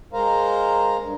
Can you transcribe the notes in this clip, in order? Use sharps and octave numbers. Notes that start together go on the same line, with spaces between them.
G#3 A#4 C5 F5 A#5
G2